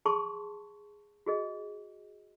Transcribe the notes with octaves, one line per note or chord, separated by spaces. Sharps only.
G#4 A5 C6 C#6
F#4 G#4 D#5